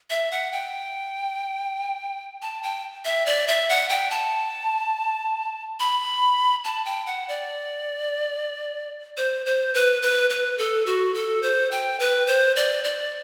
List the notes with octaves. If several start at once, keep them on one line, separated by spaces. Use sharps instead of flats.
E5
F#5
G5
A5
G5
E5
D5
E5
F#5
G5
A5
B5
A5
G5
F#5
D5
C5
C5
B4
B4
B4
A4
F#4
A4
C5
G5
B4
C5
D5
D5